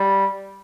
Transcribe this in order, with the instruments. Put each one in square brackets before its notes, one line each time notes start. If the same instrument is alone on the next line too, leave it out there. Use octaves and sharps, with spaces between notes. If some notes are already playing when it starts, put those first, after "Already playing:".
Already playing: [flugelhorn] G3